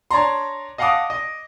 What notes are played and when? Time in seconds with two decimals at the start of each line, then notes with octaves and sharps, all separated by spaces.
0.11 D4 C#5 D5 A5 A#5 C6
0.78 D#5 F5 F#5 A5 D6 D#6
1.10 D#5